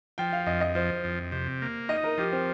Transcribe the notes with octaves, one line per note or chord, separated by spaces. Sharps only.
F3 G5
F5
F2 D#5
D#5
F3 C5
F2
C3
A#3
D#4 D#5
A#4
F3 G4
C4